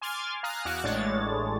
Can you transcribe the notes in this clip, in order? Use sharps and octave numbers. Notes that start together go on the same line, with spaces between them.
G#5 C6 D6 F6 G#6 A6
F5 G#5 A#5 D#6 F6 F#6
E2 F#4 D6 F#6 C#7 E7
A1 A2 G#3 D4 C#5 A6